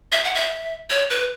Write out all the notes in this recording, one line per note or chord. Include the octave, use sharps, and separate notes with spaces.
E5
F#5
E5
C#5
B4